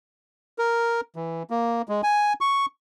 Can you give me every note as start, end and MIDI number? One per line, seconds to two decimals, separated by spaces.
0.58 1.01 70
1.16 1.43 52
1.50 1.82 58
1.89 2.02 56
2.03 2.33 80
2.41 2.66 85